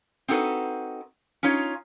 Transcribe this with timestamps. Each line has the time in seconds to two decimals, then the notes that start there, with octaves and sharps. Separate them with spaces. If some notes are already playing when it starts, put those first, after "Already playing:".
0.28 C4 D#4 F#4 G#4 A4 B4
1.43 C#4 D#4 F4 C#5